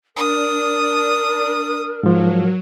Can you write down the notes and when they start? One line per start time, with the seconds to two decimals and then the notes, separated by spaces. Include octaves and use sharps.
0.16 D4 A#4 D#6
2.03 G#2 F3 F#3